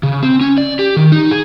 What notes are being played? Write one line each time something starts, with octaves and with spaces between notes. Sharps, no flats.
C#3
C4
C#4
D5
G4
D#3
D#4
G#4